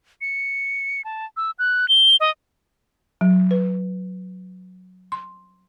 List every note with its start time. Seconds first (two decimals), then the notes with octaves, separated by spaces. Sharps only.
0.21 C#7
1.05 A5
1.37 E6
1.59 F#6
1.89 G7
2.20 D#5
3.21 F#3
3.51 B4
5.12 C6